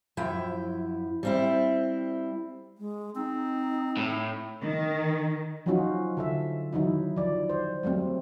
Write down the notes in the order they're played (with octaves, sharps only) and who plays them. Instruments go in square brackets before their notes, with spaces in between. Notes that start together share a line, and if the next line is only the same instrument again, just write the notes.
[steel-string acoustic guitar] F#2 F3 E4 G5
G3 C4 E4
[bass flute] G#3
[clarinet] C4 [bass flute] D#4
[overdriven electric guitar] A2
[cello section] D#3
[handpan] F3 F#3 C#4 D#4 F4 F#4
D3 A4 E5
D#3 F#3 D#4 E4
F3 D5
C5
F#3 G3 A3 C4